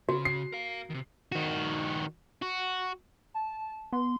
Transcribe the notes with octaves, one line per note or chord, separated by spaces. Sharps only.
C#3 F#4
C7
A#4 F5
C3 D#3
D#3 F#4
F#4
A5
B3 C6